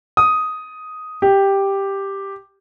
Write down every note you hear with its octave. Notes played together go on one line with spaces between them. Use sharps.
D#6
G4